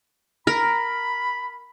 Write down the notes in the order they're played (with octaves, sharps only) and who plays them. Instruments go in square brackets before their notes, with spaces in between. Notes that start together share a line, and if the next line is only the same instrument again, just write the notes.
[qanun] A#4 [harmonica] B5